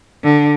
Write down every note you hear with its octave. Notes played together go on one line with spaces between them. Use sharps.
D3